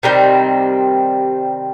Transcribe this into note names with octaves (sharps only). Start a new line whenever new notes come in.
C3 D#3 G3 C4